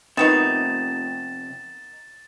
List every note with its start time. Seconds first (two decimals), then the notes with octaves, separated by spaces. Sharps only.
0.17 F2 C3 D#3 B3 D#4 A6 E7